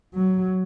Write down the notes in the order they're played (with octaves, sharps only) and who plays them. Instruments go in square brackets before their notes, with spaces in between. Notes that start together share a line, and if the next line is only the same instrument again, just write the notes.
[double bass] F#3